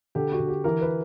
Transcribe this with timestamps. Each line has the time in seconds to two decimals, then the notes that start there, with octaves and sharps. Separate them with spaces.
0.15 D3 G4
0.32 F#4
0.40 D3
0.48 G4
0.64 E3 A#4
0.81 B4